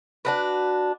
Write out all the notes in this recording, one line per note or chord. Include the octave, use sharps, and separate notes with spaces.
D4 F#4 B4